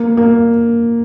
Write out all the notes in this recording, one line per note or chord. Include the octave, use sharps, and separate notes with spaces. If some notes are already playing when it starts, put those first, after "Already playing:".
Already playing: A#3
A#3